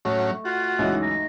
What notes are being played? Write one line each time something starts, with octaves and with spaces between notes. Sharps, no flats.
A2 F#3 A3 C#4
F4 F#4
C#2 F#2 E3 D#4
A#5